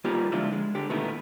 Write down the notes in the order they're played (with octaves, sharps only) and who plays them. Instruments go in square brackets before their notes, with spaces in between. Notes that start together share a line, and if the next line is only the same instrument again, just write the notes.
[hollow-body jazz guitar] G3 A#3 B3 D#4 F4 G4
C#2 D3 F3 G#3 E4 F4
G#3
D3 G4
A#2 D#3 A3 B3 D#4 E4